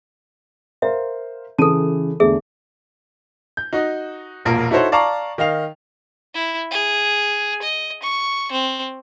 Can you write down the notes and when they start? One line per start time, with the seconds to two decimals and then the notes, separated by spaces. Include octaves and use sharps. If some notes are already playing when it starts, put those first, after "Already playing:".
0.82 A#4 C5 E5 F5
1.58 C#3 E3 A4 A5 D#7
2.20 E2 D3 A3 G#4 E5
3.57 G6
3.73 D#4 F#4 D#5
4.45 E1 A#1 A#3 F4 A#4
4.71 D#4 E4 F#4 A4 C5 C#5
4.92 D5 F5 A5 A#5 C#6
5.38 D#3 D#5 F5 F7
6.34 E4
6.71 G#4
7.62 D#5
8.02 C#6
8.52 C4